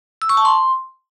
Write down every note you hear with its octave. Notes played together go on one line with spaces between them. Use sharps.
E6
C#6
A5
C6